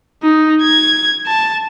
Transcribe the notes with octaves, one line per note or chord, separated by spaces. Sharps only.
D#4
G#6
A5